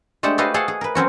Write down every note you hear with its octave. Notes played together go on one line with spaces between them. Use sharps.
G#3 A3 D4 G4 F#5 A5
F#4 G4 A4 B4 D#5 F5
G#4 A4 F5 F#5
G#4
A#4 B4
F#3 C4 C#4 F#4